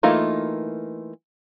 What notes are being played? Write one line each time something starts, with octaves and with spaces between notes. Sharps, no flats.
E3 A3 A#3 D#4 F4